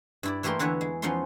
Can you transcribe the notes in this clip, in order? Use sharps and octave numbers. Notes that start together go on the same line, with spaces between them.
G2 E4 D5
E3 A3 A#3 G4 A#4 C6
E2 D3 E3 B4 C#5 E5
G#3
E2 F3 B3 C#4 D#4 C6